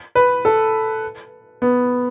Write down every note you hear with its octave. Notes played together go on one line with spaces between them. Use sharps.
B4
A4
B3